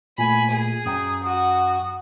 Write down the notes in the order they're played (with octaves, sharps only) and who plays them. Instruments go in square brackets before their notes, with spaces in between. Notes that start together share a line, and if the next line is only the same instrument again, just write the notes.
[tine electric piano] A#2 A3 [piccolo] G#5 [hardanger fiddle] B5
[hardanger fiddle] G#4
[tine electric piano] F#2 G5 A#5 [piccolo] D#6
[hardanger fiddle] F#4 [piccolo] D#6